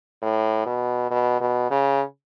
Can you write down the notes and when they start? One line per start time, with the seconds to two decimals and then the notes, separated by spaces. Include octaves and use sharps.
0.22 A2
0.66 B2
1.10 B2
1.41 B2
1.71 C#3